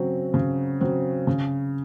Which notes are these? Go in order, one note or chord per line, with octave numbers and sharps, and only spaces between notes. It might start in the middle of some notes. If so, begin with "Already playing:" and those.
Already playing: C#3 F#3 C4
C#3
F#3 C4
C#3